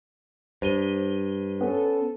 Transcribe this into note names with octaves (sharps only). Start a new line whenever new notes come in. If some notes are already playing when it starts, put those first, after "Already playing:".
G2 C5 D#7 G7
B3 C#4 A4